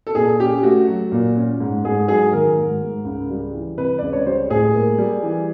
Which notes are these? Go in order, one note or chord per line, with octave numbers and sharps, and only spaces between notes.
A4
A#2 G#4
C#4 G4
A3 F#4
F#3
A#2
C#4
G#2
G#2 G#4
F#3 G#4
D#3 A#4
G#2
G#2
C#2
G3
E3
C3 B4
C#2 D5
C#5
G3 C5
A2 G#4
A#3
G3
E3